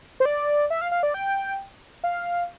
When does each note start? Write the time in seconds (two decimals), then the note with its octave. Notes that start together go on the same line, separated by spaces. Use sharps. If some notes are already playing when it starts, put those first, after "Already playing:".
0.20 C5
0.25 D5
0.70 E5
0.81 F5
0.92 F5
1.03 D5
1.14 G5
2.04 F5